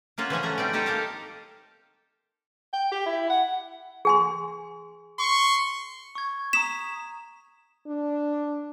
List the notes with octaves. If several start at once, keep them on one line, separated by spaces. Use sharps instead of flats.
A#3 C#4 F4 F#4
E3 F3 C#4 G#4
A3 F#4 A#5
G3 C4 D#4 D5
D#4 G4 A4 D#5
A#3 G4 A4 A#4 C5 F5
G5
G4
E4
F#5
G#4 G#5 C6
C6 C#6
C#6 G#6
A#5 D#6 B6 E7
D4